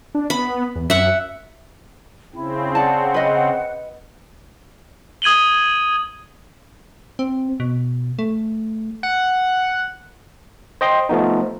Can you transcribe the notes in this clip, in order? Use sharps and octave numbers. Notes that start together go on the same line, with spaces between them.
D4
B3 B5
E2
F#2 E5 F#5
C#3 C4 E4
D5 F#5 A5
B4 D#5
D#6 G#6 D#7 F#7 G7
C4
B2
A3
F#5
C5 D#5 G5 C6
F3 A3 B3 D#4